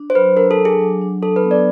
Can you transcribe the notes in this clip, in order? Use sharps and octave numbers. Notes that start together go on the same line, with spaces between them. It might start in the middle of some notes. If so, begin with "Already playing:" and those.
Already playing: D4
C5
F#3 B4
D4 A#4
A4
D4
G#4
F#3
D4
D4 A4
B4
B3
D5